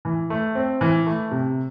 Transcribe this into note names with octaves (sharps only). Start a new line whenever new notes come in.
E3
A3
C4
E3
A3
C3